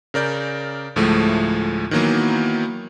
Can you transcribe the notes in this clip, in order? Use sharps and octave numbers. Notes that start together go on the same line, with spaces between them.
C#3 A#4 D5 G6
D2 A2 F3 G#3 A3
D#3 E3 F#3 A#3 B3